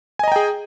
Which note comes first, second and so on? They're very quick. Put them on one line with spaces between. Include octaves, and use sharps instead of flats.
G#5 D#5 A#5 G5 G#4